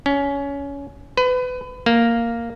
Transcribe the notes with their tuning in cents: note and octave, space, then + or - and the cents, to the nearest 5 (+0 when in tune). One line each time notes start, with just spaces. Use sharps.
C#4 +20
B4 +30
A#3 -5